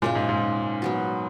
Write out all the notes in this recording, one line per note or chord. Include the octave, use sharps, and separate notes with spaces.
A#2 C#3 G#3 C#4
G#2
G#2
F#3 B3 F#4